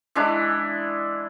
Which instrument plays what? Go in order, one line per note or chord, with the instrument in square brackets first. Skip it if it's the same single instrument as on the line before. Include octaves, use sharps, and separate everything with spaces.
[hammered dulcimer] E3 G#3 D4 E4